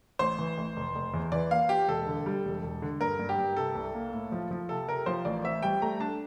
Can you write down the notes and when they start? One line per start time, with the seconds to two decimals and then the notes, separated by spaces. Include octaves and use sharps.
0.19 A1 C5
0.39 E3
0.58 A1
0.76 F1
0.95 F1
1.14 E2
1.32 E3 D5
1.51 A#3 F5
1.69 F4 G4
1.88 E1 A4
2.07 D3
2.26 G3
2.45 E1
2.63 E1
2.82 D3
3.01 G2 A#4
3.19 G2
3.29 G4
3.38 G2
3.57 C3 A4
3.75 C2
3.94 A#3
4.13 A2
4.32 F3
4.51 F3
4.69 C3 A4
4.88 C3 A#4
5.06 F3 C5
5.25 A1 D5
5.44 C4 E5
5.62 G3 G5
5.81 A3 A#5
6.00 D4 A5